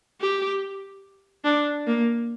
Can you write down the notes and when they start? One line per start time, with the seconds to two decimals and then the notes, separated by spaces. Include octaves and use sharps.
0.21 G4
1.45 D4
1.87 A#3